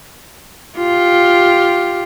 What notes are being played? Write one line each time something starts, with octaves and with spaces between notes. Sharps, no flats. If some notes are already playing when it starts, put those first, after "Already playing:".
F4 G4